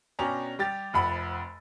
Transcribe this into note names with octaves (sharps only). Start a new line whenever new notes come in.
B2 C#4 D4 G4 A#5
G3 G4 A6
F1 F2 F#5 B5